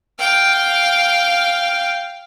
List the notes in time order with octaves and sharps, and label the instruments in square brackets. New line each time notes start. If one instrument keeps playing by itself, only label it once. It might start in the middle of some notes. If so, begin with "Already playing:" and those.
[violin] F5 G5